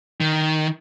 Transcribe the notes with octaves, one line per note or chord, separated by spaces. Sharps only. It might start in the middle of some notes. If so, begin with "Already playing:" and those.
D#3